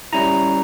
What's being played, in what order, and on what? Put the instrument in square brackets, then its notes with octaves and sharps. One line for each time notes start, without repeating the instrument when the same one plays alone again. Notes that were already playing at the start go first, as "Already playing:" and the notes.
[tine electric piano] G3 C#4 E4 A#5